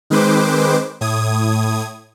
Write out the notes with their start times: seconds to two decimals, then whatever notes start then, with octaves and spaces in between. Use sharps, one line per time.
0.10 D#3 G#3 C4 B4 C5 D6
1.01 A2 D#6 G#6